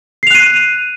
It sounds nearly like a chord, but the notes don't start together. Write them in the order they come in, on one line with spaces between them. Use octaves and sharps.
C7 F7 F#6 D#7